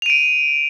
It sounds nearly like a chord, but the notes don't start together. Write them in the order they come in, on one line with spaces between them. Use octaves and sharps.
F7 D#7 D7